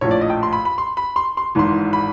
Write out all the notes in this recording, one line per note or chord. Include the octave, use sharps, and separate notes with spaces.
A#1 A2 F3 C#5
D5
D#5
G5
C6
B5
B5
C6
B5
C6
C6
G#1 G#2 E3 C6
B5